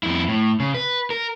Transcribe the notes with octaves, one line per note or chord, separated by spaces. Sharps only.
F2 E4
A2
C#3
B4
A#4